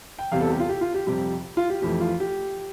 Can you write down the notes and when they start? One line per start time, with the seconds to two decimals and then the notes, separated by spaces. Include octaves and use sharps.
0.19 G5
0.31 E2 C3 G3 B3 F5
0.41 A4
0.50 G4
0.60 F4
0.69 G4
0.81 F4
0.94 G4
1.07 F2 C3 G3 G4
1.57 F4
1.70 G4
1.82 F2 E3 A3 G4
2.01 F4
2.20 G4